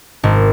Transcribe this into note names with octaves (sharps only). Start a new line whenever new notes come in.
G#1